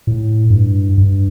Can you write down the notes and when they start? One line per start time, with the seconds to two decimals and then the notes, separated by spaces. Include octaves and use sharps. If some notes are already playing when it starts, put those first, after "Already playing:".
0.07 A2
0.50 G2
0.98 G2